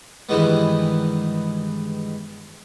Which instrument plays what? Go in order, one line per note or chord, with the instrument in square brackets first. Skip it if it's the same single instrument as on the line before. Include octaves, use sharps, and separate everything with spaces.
[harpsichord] G2 D#3 E3 G#3 B3